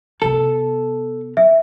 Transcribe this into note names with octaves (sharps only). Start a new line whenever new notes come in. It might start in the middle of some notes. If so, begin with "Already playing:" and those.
C3 B3 A4
E5